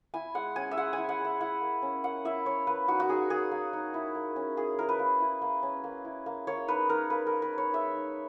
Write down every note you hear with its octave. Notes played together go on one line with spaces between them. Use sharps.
E4 G#5
G#3 F#5
C#4 G#5
E5
G#3 F#5
G#5
E4
F#5
G#3
E5
E4 F#5
A#3
C#4
A#3 F#5
E4 E5
A#3 C#5
A#3 B4
D#4 F#4
F#4
D#4 G#4
A#3 G#4
A#3
D#4
E4
A#3
C#4
A#3 G#4
E4 A#4
B4
A#3
E4
A#3
C#4
A#3
E4
A#3
A#3 C#5
D#4 B4
D#4 A#4
A#3 B4
A#3 A#4
B4
D#4 C#5
G#3 E5
D#4